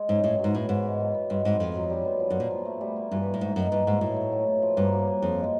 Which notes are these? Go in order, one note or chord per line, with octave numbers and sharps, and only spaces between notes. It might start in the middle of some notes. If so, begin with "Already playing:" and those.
Already playing: G#3
G#2 C#3
A2 E3
F#3
G#2
A2 B3
G#2 E3
G#3
F#3
B3
G2 G#3
G#2 C4
F2 D#3
F#3
G3
B3
F3
F#2
A#2 A#3
F3
A3
G3
A#3
G2 E3
A3
A2
G#2 A#3
F#2 D#4
G2 E3
G#2 A3
A2 F#3
A3
F#3
B3
F3
G2 A#3
F#3
A#3
F2 F3
G#3